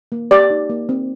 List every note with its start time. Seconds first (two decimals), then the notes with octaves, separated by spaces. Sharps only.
0.12 A#3
0.31 G4 D5
0.50 D#4
0.69 A#3
0.89 C4